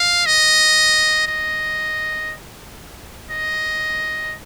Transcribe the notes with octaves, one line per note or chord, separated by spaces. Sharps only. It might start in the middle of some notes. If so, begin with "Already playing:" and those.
Already playing: F5
D#5
D#5
D#5